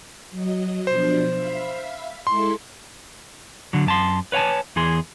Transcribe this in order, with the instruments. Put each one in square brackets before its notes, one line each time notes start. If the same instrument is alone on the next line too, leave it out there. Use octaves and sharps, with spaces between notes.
[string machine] F#3 D#5
[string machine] B2 F3 D4 [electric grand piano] C5
[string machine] E5 F5 B5
[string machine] G#3 E4 A4 [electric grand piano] C6
[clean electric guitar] D3 F#3
F#2 A5 C6
B4 C#5 F5 G#5 A5
E2 E3 G#4 C6